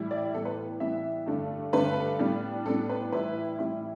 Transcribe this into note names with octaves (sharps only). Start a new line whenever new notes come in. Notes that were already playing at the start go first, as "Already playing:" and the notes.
Already playing: A2 E3 G3 E4
D5
A2 E3 G3 B3 A4
B4
A2 E3 G3 B3 E5
G2 D3 A3 D4
G2 D3 A3 D4 B4
A2 G3 B3 D4
A2 G3 B3 D4 A4
B4
A2 E3 G3 E4 B4
A2 E3 G3 E4